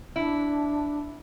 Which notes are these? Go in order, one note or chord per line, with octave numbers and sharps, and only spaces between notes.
D4 E4